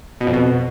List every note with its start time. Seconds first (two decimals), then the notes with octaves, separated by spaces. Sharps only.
0.21 B2
0.27 F2
0.33 B2